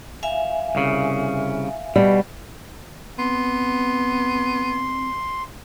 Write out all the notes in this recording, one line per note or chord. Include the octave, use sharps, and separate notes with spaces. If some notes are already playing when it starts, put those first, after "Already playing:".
E5 F5 G#5
C2 C#3
B2 G3
B3 C4 C6